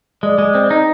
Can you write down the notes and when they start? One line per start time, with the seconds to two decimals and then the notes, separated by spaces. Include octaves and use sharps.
0.23 G#3 D5
0.38 G#3
0.55 C4
0.70 D#4